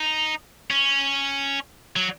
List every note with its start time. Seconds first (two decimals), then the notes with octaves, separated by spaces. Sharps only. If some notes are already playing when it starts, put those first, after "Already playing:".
Already playing: D#4
0.70 C#4
1.96 F#3